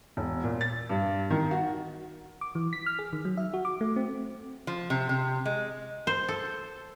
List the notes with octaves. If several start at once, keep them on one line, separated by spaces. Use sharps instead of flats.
E1
A#2
A6
G2
D#3
F#4
D6
E3
B6
F6
G#4
D#3
F#3
E5
F#4
D6
A3
C4
F3
C3
C3
G#3
C5
A4